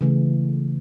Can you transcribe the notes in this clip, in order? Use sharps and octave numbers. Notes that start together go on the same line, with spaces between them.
C#3 E3 A3